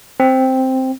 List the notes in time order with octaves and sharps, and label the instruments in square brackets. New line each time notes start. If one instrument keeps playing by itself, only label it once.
[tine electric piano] C4